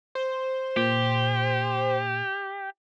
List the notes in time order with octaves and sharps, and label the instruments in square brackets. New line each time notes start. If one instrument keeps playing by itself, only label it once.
[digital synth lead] C5
[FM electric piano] A#2 [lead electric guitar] G4